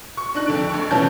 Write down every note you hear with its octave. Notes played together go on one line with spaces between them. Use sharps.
C#6
D4 D#4 F#6
F2 D3 D7
F1 C#6
A#1 B2 E3 C#4 A5 G6